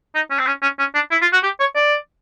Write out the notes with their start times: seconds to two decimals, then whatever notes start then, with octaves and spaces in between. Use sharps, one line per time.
0.15 D#4
0.30 C#4
0.39 C4
0.46 C#4
0.62 C#4
0.79 C#4
0.94 D4
1.11 E4
1.22 F4
1.33 F#4
1.43 G4
1.60 C#5
1.75 D5